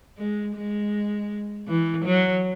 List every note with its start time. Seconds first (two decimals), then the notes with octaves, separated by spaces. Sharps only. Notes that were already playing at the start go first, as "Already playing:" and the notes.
0.18 G#3
0.56 G#3
1.68 E3
2.05 F#3